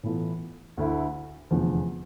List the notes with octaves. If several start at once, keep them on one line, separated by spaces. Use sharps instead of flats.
A2 E3 B3 F4 A4
D2 D3 A3 E4
F1 E2 D3 F3